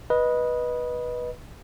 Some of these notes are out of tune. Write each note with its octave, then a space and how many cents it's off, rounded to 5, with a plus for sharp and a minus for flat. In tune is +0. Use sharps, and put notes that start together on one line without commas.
B4 -15 D#5 +0